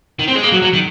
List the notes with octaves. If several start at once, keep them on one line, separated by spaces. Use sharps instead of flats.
D#3
C4
G#3
A#3
F#3
F#3
D#3